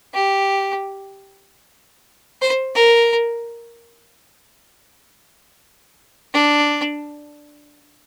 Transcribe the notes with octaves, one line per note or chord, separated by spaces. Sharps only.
G4
C5
A#4
D4